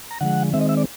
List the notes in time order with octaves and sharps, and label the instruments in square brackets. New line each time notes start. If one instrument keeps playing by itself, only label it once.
[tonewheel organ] A#5
D3 F3 G#3 F#5
D#3 G#3 C4 E5
D#5
E5
D5